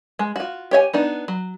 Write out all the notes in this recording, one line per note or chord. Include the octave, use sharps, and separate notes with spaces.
G#3
F4 F#4
G4 C#5 E5 G#5
B3 D4 D#4
F#3